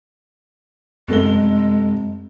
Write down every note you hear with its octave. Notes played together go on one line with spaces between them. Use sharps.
F1 F#2 G#3 A4 G7